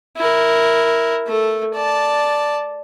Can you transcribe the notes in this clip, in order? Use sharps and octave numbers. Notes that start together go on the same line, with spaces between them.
E4 A#4
A3 A4
D5 A5